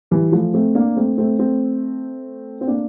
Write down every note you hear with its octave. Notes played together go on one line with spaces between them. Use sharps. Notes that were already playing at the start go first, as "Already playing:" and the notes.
E3 G3
F3 A3
A3 C4
A#3 D4
A3 C4
A3 C4
A3 C4
C4
A#3 D4